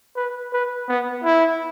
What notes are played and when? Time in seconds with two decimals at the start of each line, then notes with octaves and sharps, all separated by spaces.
0.16 B4
0.53 B4
0.89 B3
1.24 E4